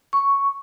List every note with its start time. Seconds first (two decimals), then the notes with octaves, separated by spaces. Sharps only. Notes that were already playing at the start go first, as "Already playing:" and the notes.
0.13 C#6